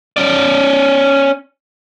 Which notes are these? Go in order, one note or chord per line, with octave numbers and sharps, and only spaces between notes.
C#4 D5